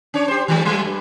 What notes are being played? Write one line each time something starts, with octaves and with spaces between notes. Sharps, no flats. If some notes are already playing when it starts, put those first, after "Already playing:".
C#4 D4 C#5
G4 C5
D#3 G3 G#3
F#3 G#3
G2